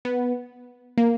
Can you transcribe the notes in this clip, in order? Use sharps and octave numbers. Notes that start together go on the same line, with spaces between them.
B3
A#3